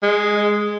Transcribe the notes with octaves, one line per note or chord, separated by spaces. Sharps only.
G#3